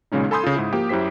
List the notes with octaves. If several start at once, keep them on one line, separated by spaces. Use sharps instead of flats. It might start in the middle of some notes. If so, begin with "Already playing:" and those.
B1 A#2 C#3 G#3 C#4 D#4
A4 G#5 B5 C6 D#6 G6
C#3 F4
G#2 E4
F3 A#3 G4
F#2 E4 G4 C5 B6